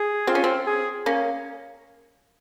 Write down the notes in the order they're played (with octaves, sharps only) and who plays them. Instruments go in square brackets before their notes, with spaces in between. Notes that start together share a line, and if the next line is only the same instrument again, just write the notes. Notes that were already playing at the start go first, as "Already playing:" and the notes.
Already playing: [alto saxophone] G#4
[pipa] C4 [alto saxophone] F4
[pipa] C#4
C4
[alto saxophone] G#4
[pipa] A#3 C#4